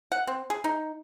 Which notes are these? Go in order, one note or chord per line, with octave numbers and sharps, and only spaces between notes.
F#5
C4
G#4
D#4